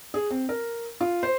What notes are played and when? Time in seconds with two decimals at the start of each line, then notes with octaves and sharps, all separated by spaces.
0.14 G#4
0.31 C4
0.49 A#4
1.01 F4
1.23 C5